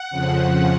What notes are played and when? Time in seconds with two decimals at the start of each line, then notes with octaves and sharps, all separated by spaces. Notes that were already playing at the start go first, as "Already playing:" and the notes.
Already playing: F#5
0.10 F2 C#3 F3